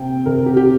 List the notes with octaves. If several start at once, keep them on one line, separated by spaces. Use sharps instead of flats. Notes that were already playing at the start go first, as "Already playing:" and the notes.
Already playing: C3 A#3 G5
C3 A#4
G4
G4